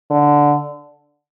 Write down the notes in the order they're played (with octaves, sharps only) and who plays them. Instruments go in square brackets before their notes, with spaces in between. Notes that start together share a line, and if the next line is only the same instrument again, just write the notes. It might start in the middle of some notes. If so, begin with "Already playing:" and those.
[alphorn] D3